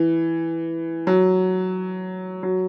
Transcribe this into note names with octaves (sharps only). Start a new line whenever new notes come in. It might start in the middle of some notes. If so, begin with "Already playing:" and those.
Already playing: E3
F#3
F#3